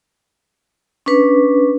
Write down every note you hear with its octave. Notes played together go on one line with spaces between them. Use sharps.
C#4 D4 B4